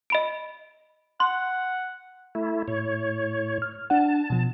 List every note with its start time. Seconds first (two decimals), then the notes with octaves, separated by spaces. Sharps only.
0.10 D#5 B5 D7
1.20 F#5 C6
2.35 A3 E4
2.68 A2 C#5
3.62 F6
3.90 D4 F#5 A5
4.30 B2 F3